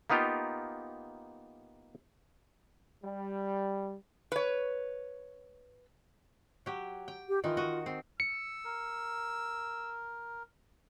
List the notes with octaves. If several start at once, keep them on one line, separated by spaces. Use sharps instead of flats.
A#3 B3 D#4 F4 G4
G3
B4 C#5
F#3 G4
G5
G4
D#3 E3 D#4 F4
F#4 D#5
C4
E6 C#7
A#4